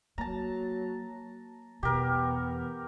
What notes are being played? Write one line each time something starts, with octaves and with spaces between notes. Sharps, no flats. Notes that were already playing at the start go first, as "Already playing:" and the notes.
F#3 A#3 A5 A#5
E2 B2 B3 G4 A#4